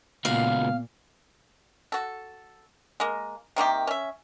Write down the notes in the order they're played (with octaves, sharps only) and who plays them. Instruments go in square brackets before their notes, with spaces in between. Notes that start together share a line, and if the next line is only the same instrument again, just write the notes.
[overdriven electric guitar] C#2 F#4 [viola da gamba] A#2 [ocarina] B3 [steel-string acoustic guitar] F5
[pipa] F#4 A4
G#3 A#3
C3 D#3 A#3 G4
C#4 E5